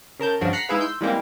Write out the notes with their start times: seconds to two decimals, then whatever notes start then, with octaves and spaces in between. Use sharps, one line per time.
0.19 C#3 A#4 A5 G6
0.41 G2 C#3 F3 D4 F#4
0.53 F#5 A#5 B6 C7
0.69 G#3 D#4 E4 G#4 B4 F5
0.81 C6 E6 G6
1.01 E3 G3 G#3 A#3 C4